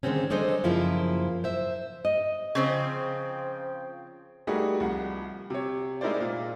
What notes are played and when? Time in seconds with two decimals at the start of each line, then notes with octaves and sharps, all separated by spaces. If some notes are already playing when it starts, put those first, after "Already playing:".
0.03 D3 D#3 G#3 A3 C4 C#4
0.30 F#3 G#3 D4 A4 C5 D#5
0.64 F#2 C#3 F3 A#3 E4 F4
1.44 C5 E5
2.05 D#5
2.55 C#3 F3 C4 C5 G5
4.47 G3 A3 A#3 D#4 F#4 G#4
4.80 C2 F3 F#5
5.50 C3 C#5
6.01 G#3 D#4 E4 A#4 C5 D5
6.20 A#2 F4